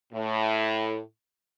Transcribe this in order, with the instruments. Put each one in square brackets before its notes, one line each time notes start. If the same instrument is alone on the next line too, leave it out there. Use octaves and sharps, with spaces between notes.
[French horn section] A2